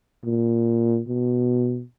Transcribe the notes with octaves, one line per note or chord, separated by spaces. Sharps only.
A#2
B2